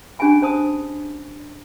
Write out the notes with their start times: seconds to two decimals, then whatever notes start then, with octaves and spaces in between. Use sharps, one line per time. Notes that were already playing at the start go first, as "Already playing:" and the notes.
0.19 C#4 D4 G4 G#4 G#5 B5
0.42 C5 A5 D#6